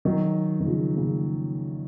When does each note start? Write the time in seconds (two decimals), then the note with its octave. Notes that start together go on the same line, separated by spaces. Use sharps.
0.05 D#3 F#3
0.60 D#3
0.66 C#3 F3
0.96 A#2 C#3